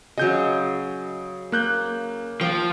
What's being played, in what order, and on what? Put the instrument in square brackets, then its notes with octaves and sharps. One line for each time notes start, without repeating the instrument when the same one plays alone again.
[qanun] C#3 F#3 [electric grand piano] D#5 G6
[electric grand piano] A#3 F#6 G6
[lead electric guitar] F3 [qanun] G5